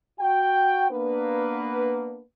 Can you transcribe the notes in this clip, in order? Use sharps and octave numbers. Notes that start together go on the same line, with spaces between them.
F#4 G5
A#3 B3 D4 B4